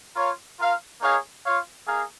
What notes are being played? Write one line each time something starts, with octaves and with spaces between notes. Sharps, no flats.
F4 A#4 C#5 F5
F4 A#4 F5
A#3 D#4 G#4 C#5 F5
F4 C#5 F5
A#3 D#4 G#4 F5